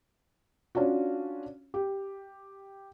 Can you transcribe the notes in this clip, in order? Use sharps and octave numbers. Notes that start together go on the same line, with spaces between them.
C#4 D4 F4 F#4
G4